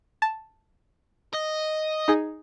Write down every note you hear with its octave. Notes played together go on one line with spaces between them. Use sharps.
A5
D#5
D#4 G#4